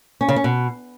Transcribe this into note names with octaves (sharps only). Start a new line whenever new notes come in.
C#4
C#3
C#4
B2